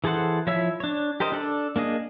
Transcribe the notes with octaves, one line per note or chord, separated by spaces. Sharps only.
E3 G#4 A4 C5 F#5
F3 E4 C#5 E5 E6
D4 C#5
G4 A#4 C5 D#5
D4 A4 D5
A#3 D4 G#4 D#5